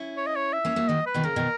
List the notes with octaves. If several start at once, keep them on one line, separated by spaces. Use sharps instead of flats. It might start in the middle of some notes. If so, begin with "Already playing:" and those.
Already playing: C#4 E4
C#5
D#5
C#5
E5
A#3 C#4
F#3 A#3
D#3 F#3 D#5
B4
B2 D#3
C#3 A#4
B2 D#3